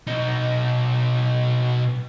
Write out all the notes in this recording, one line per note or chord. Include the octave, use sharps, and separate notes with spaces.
B2 D#4